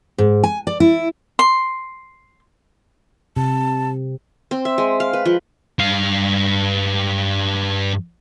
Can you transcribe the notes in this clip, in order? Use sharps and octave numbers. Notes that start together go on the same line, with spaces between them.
G#2
G#5
D5
E4
C6
C3 A5
C4
E5
G#3
F5
B4
F3
G2 F5